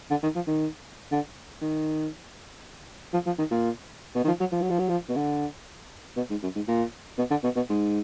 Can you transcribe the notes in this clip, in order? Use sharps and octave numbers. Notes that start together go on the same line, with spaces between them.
D3
D#3
F3
D#3
D3
D#3
F3
F3
D#3
A#2
B2
D#3
F3
F#3
F3
F#3
F3
F#3
F3
B2
D3
B2
G#2
F#2
G#2
A#2
B2
D3
B2
B2
G#2